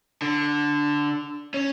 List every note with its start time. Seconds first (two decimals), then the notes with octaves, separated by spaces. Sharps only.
0.22 D3
1.54 C#4